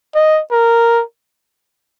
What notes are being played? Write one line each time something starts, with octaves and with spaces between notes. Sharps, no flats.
D#5
A#4